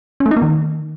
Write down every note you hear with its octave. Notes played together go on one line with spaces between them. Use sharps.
C#4
A3
D#4
A#3
D#3